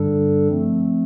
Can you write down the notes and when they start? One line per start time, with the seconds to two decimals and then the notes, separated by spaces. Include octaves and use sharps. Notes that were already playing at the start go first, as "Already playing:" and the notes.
Already playing: G2 D3 G3 D4 A4
0.48 F3 A3 C4